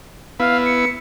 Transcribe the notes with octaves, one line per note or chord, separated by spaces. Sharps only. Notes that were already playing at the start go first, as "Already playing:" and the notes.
B3 E4 B4 F5
C#7